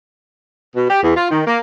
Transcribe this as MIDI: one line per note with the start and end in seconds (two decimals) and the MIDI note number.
0.76 0.87 47
0.90 1.02 67
1.03 1.13 40
1.16 1.29 65
1.30 1.43 51
1.47 1.59 58